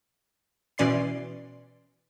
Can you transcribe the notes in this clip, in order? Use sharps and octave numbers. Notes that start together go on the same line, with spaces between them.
B2 E3 C#4 D5 C6 C7